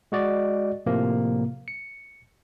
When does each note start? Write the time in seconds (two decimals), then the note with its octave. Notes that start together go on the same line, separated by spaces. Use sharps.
0.12 G#3 F#4 D5 D#5
0.86 A2 C3 F3 A#3
1.68 C#7